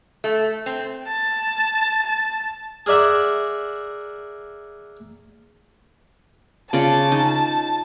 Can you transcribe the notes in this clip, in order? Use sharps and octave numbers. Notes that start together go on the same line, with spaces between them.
A3
C4
A5
A5
G#4 A#4 D5 E5 F#5
C#3 F4 D5 A5
D#4